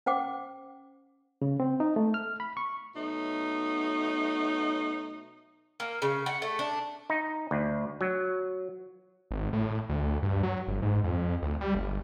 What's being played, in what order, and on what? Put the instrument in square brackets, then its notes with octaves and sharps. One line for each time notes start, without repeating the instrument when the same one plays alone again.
[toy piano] C#4 C5 F#5 G5 D6
[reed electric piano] C#3
C4
D#4
A3
F6
B5
C#6
[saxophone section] B2 F#3 A3 D#4
[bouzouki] A#3
C#3
F#5
A3
D4
[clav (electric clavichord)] D#4
D2
F#3
[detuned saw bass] G#1
A2
D2
G2
F#3
G1
G#2
F2
D2
G3
G1